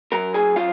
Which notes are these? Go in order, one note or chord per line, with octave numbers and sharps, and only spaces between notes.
F#2 A#4 A#5
G#4 G#5
F#3 F4 F5